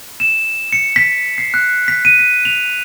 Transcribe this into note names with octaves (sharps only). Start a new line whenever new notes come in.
E7
C#7
B6
C7
F#6
B6
D#7
B6
F7